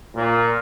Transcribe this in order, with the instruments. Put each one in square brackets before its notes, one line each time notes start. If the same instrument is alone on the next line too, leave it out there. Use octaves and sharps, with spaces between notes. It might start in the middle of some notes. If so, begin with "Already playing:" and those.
[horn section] A#2